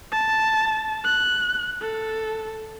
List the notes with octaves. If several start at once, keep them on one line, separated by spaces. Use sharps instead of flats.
A5
F#6
A4